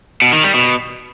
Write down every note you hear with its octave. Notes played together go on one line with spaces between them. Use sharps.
B2
D#3
G3
B2